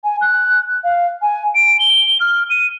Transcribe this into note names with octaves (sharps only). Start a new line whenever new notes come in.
G#5
F#6
F5
G#5
D7
G7
F6
D#7